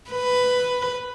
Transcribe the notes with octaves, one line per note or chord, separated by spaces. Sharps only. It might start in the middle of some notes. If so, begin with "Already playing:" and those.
B4